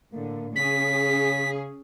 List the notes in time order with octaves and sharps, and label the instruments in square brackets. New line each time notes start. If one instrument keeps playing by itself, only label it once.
[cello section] A2 D3 [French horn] A#3
[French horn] C#3 [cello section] C#4 G#4 [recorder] B6